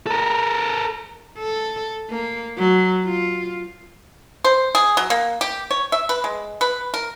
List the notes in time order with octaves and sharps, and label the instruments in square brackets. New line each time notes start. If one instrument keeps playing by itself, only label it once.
[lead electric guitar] A4 A#4
[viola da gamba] A4
A#3
F#3
F4
[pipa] C5
G#4
F#3
A#3
G4
C#5
E5
B4
G#3
B4
A#4